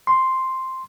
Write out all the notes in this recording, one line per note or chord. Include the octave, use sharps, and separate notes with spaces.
C6